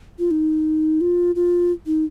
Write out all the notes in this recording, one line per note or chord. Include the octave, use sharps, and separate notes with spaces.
F4
D#4
F4
F4
D#4